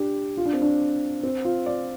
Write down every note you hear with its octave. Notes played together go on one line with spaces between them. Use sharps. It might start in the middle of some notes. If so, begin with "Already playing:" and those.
Already playing: D4 G4
F4
D4
C4
D4
C4
F4
D5